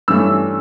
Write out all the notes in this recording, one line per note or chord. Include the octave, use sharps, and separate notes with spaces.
G2 E3 A3 C#4 E6